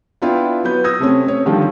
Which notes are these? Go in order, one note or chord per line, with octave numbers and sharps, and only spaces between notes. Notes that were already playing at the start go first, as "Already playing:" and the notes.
B3 D4 E4 F4 B4 G5
F#3 B3 B4 G6
D#6 E6 G#6 A#6
C3 A3 C4 C#4
C#5
D3 D#3 F3 G3 A3